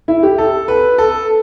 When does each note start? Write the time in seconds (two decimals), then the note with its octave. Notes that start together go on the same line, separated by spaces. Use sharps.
0.08 E4
0.23 G4
0.38 A4
0.68 B4
0.98 A4